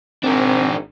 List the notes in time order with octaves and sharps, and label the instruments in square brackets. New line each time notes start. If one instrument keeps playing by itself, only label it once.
[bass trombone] G#1 [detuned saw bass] C4 [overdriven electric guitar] D4 A#4